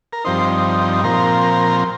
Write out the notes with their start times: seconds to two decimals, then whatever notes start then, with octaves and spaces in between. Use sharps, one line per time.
0.13 A#4
0.25 G2 F3 C4 D#4 C5
1.04 A#2 F3 C4 A#4